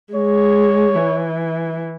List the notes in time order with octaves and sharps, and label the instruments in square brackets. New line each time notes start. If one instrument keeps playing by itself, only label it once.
[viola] G#3 [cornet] C#5
[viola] E3